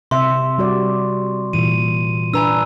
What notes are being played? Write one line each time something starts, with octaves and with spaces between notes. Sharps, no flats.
C3 E5 C6
G3 F#4 D5
A#2 E3 D#7
D4 B4 G#5 A#5 E6